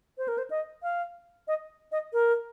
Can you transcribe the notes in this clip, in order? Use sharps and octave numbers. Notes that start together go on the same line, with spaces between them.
C5
A#4
C5
D#5
F5
D#5
D#5
A#4